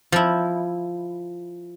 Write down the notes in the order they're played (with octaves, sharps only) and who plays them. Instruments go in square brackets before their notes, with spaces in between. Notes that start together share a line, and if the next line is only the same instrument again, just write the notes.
[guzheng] F3 E4